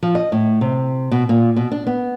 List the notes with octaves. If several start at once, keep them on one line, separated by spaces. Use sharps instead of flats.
F3
D#5
A2
C3
B2
A#2
B2
D4
B3